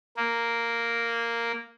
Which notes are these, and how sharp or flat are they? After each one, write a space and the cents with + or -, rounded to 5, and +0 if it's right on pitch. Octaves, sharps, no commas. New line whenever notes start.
A#3 -5